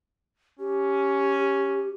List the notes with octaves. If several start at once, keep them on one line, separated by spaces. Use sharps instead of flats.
C#4 G4